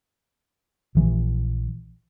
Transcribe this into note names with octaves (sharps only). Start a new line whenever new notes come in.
A#1 E3